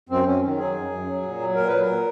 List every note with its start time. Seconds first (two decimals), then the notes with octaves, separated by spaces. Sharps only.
0.09 F#2 C4
0.26 F#2 C#4
0.42 D#3
0.58 F#3 G#4
0.74 F#2
0.90 F#2
1.07 F#3
1.23 A#2
1.39 F#3
1.55 A#2 A#4
1.67 F#3 B4
1.81 A#4
1.87 A#2